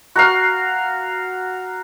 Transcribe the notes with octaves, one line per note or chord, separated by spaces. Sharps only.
F#4 A#4 F5